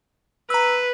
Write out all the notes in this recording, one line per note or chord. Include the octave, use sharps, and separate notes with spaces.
B4 A#5 E6